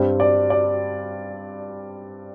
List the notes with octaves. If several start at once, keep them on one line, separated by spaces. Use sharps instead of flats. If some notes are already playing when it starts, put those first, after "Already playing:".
Already playing: G2 G3 C4
D5
D5